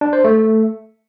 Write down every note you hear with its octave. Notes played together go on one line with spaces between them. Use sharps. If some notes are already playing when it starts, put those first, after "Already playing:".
D4
C5
A3